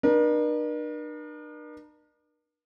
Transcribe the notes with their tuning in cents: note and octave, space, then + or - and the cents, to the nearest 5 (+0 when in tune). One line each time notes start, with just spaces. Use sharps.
D4 +45 A#4 +45